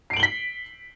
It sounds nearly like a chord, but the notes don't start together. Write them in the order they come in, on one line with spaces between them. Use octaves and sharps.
C7 D7 F#7 G7 B6